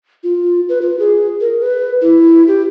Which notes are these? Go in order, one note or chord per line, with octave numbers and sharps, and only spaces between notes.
F4
B4
F4
G#4
A#4
B4
E4
G4